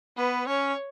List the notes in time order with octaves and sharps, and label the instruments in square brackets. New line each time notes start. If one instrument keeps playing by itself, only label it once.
[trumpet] B3 [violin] B4
[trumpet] C#4 [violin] C#5